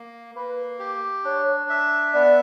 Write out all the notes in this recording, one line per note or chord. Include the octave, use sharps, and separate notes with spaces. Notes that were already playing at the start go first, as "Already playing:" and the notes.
Already playing: A#3
A#3 B4
G4
D4 C#5
E5
B3 D5